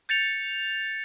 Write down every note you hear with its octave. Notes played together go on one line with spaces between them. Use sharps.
G6 A6 C#7 F7